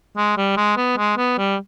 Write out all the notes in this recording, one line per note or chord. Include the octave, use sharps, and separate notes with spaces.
G#3
G3
G#3
B3
G#3
B3
G3